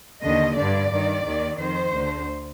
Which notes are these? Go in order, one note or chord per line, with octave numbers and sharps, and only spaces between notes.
D#2 D3 D#5
G2 D3 D5
G2 D#3
D#2 D#3
F2 D#3 C5
D2 D3